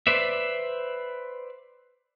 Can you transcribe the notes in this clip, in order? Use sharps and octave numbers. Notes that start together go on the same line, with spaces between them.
B4 C5 D5 E5